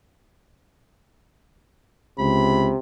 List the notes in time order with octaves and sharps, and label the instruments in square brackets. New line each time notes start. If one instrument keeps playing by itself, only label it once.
[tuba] C#2 [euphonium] C3 [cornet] B5